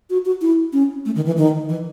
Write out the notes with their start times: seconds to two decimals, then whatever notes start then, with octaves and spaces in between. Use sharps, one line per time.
0.10 F#4
0.26 F#4
0.42 E4
0.73 C#4
1.06 A3
1.16 D#3
1.26 E3
1.37 D#3
1.69 E3